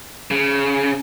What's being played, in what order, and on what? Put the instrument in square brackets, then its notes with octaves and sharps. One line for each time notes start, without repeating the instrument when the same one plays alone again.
[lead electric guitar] C#3